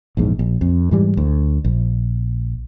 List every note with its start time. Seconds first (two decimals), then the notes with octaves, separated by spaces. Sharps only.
0.17 A#1 E2 G#2
0.39 A#1
0.61 F2
0.91 G#2 E3 G3
1.17 D2
1.64 A#1